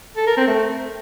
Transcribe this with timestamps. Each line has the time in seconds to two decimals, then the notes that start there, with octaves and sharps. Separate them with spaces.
0.17 A4
0.27 A#4
0.37 C4
0.48 A3